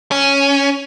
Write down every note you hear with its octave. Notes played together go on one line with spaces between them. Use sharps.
C#4